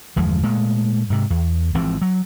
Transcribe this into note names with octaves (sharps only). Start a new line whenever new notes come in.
G1 E2 F3 G#3
A#2 G#3 A3
G#2 C3
E2
G#1 E3 F3 C4
F#3